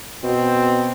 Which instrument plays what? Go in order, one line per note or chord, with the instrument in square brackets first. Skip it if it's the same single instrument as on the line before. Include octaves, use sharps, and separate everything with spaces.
[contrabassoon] B2 [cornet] C4